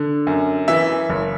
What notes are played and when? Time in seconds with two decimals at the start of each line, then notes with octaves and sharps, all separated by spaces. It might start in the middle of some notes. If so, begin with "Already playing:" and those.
Already playing: D3
0.27 F#2
0.68 E3 E5
1.09 F#1